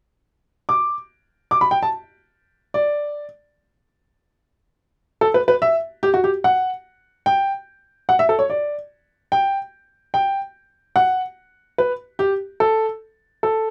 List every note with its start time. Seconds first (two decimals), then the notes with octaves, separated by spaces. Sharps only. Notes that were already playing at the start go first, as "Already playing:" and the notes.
0.69 D6
1.51 D6
1.61 B5
1.71 G5
1.83 A5
2.74 D5
5.21 A4
5.34 B4
5.48 B4
5.62 E5
6.03 G4
6.14 F#4
6.24 G4
6.44 F#5
7.26 G5
8.09 F#5
8.19 E5
8.29 A4
8.39 C#5
8.50 D5
9.32 G5
10.14 G5
10.96 F#5
11.78 B4
12.19 G4
12.60 A4
13.43 A4